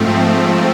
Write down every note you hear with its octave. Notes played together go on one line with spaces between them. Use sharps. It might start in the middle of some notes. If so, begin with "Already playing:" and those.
Already playing: G#2 F3 A3 C4